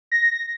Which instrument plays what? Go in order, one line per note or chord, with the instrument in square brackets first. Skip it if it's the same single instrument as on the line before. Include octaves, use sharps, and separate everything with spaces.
[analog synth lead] A#6